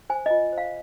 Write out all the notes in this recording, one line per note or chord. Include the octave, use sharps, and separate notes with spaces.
C5 G#5
F4 D#5
C5 F5